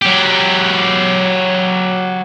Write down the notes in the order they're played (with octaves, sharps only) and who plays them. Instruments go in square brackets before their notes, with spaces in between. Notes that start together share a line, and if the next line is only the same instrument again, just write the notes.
[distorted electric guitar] F#3 G4